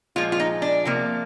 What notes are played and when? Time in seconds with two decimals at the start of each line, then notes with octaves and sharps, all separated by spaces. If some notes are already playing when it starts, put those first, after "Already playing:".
0.16 A#2 F3 G#3 F4
0.32 F4
0.40 D#4
0.62 D4
0.85 C3 F3 A#3